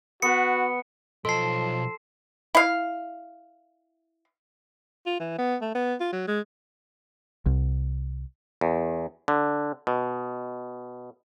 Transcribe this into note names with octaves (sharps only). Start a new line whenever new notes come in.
B3 F#4 B4 C#7
B1 F3 A4 D#5 A5 C6 C7
E4 F5
F4
E3
B3
A3
B3
F4
F#3
G#3
C2
E2
D3
B2